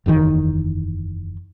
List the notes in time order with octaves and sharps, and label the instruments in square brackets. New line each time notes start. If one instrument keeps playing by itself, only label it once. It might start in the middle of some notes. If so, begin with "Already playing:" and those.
[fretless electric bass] F#1 E2 A#2 D#3